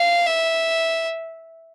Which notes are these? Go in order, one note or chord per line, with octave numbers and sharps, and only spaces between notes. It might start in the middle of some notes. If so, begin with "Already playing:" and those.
Already playing: F5
E5